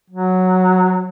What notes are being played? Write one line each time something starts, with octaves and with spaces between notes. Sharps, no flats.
F#3